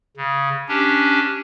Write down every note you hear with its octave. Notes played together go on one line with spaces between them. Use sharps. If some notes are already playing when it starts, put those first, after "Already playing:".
C#3
C#4 D4 G4